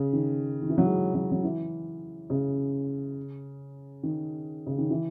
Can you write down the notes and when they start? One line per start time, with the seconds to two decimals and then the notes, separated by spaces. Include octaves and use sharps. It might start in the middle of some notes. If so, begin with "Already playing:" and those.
Already playing: C#3
0.13 D#3
0.62 D#3
0.69 E3
0.78 F#3
0.86 G#3
1.14 F#3
1.32 F#3
1.44 E3
2.30 C#3
4.03 D#3
4.67 C#3
4.78 D#3
4.90 E3